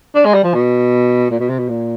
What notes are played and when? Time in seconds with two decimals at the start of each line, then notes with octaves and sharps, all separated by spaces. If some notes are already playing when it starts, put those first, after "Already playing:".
0.15 D4
0.25 G#3
0.34 G3
0.43 F3
0.54 B2
1.30 A#2
1.40 B2
1.49 C3
1.59 B2
1.69 A#2